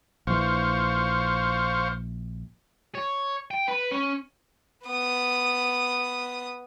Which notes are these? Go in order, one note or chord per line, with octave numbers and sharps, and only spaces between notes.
A#1 E3 C5 F5 C#6
C#5
G5
B4
C#4
B3 D#6